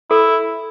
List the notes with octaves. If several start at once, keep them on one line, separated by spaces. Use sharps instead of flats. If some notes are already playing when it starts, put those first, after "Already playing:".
E4 A4